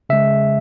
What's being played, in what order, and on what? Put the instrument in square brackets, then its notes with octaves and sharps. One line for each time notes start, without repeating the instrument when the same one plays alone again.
[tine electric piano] C#3 G#3 E5